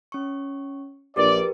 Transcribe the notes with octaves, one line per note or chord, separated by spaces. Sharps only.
C#4 C#6
A#1 G4 A#4 B4 D5